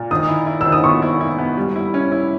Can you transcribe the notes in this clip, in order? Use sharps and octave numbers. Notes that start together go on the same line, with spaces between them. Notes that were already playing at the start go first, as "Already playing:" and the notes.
Already playing: A#2
D#3 D#6
E4
E4
D#3 E6
D#6
B3 C#6
E4
E4
B3
G3
E4
C#4
E4